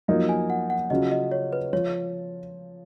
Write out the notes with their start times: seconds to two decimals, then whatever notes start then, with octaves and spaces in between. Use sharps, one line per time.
0.08 F#2 F3 A#3 D#4
0.29 G#5
0.50 F#5
0.70 F#5
0.90 C#3 F#3 C#4 F4 D#5
1.12 D#5
1.31 C#5
1.53 B4
1.73 F3 C#5